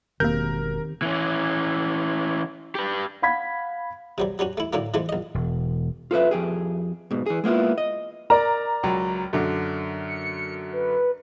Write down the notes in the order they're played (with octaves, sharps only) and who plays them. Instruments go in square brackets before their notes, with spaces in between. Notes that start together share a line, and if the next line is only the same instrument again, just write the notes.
[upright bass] E1 [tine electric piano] D#3 C4 G4 [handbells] A#3 G6 [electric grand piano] A#4
[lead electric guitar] E3 C#4
G4 B4
[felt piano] F5 F#5 B5 G#6 B6
[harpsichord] C3 F#3 G3
F#3 G3 C#4 F#4
A3 E4
A2 D3 F#3 A#3
E3 F3 G#3 A3
A#1 D#5
[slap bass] E1
[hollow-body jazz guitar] F4 A4 B4 E5
F2 G4 G#4
G#2 B2
E3 G#4
G#3 A#3 B3 E4 F4
D#5
[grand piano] A#4 D5 [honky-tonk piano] A#5
[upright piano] C#2 F#3
F#2 D3
[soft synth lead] C#7
B4